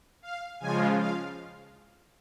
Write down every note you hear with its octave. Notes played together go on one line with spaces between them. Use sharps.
F5
C#3 F3 G#3 F4 G#5
F5